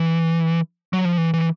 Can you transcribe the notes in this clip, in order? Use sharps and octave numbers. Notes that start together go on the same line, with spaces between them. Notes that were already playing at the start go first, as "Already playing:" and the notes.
Already playing: E3
F#3
F3
E3
E3